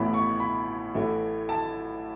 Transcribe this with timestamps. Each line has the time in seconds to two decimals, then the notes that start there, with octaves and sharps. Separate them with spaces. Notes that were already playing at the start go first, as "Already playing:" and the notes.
Already playing: A1 A2 E3 B3 B5
0.13 C#6
0.40 B5
0.94 A1 A2 E3 A3
1.49 A5